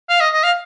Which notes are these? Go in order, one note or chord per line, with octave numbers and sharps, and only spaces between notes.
F5
D#5
D#5
F5